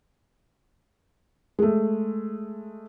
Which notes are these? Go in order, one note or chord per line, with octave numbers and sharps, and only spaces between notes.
G#3 A3